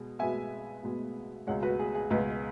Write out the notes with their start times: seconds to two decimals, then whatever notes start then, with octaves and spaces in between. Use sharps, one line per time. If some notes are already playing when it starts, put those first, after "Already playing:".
Already playing: B2 G#3
0.19 B2 G#3 B3 E5 G#5
0.83 B2 G#3 B3
1.47 C#2 B2 G#3 C#5 F#5
1.63 F#4 B4
1.79 G#4
1.95 G#4
2.10 C#2 B2 G#3 F#4 B4